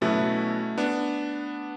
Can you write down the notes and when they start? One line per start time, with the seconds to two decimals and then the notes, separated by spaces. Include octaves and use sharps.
0.01 B2 F#3 A3 B3 C#4 E4
0.78 B3 D4